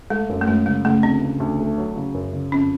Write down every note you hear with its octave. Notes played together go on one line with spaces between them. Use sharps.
G#3 A3
F#2
A3
F#2 G#3
C#3 G#3
C#3 A3
D2 C4
C#3
D2
A3
F#3
C#3
F#2
C#3
F2 C#4